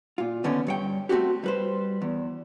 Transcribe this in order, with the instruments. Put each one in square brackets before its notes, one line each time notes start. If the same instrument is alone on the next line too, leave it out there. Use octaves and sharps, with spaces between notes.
[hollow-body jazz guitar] A#2 F4
D#2 D3 B3 C#4
G2 C#5 G5
A3 C4 D4 F#4 G4
G3 B4 C5
E2